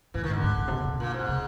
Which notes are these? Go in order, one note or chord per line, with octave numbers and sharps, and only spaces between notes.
A2 E3
G#2 D#3
D3
G#2
A#2
C3
B2
B2
A#2
G#2
C3